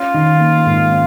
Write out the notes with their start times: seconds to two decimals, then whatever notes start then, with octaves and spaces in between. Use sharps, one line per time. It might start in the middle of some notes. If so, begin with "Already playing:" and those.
Already playing: C#4 F4
0.14 D#3
0.40 A#3
0.66 G#2
0.92 C#4